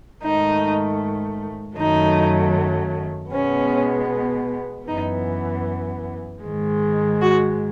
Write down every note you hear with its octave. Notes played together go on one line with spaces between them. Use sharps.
G#2 D#3 A3 D#4
F#2 D#3 F#3 A3 D#4
B2 G#3 B3 C#4
F#2 E3 B3 D#4
G#2 D#3 G#3
F#4